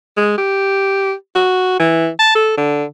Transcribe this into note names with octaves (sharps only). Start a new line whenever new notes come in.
G#3
G4
F#4
E3
A5
A4
D3